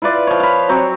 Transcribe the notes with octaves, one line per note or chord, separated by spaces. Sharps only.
E4 F4 B4 D5
F3 C#5
F5 B5
F#3 C4 C#5